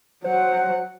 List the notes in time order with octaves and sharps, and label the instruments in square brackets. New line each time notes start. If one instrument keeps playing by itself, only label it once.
[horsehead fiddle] F#3 F#5 [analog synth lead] C5